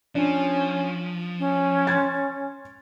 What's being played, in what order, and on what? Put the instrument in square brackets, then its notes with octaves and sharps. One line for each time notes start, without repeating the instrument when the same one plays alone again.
[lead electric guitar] F3 [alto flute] C#4 [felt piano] D4
[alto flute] C#4
[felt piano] C6 G#6 A6